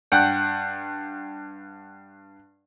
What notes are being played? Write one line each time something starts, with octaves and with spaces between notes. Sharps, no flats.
G2 F#5 G5